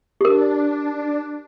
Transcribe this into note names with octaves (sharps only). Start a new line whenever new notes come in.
D4 G4 A#4